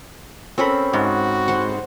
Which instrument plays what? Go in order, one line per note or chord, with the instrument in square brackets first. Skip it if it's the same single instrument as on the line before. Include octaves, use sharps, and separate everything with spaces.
[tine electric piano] C4 B5 [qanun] C#4 A4 A#4
[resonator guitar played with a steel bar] G#2 [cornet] F#4
[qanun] C5 F#5